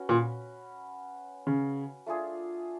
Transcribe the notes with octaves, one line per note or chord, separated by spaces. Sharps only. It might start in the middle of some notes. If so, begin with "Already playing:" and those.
Already playing: C#4 F#4 B4
A#2
C#3
A3 D4 F4 G#4